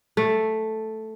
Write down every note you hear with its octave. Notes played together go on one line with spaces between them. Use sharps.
A3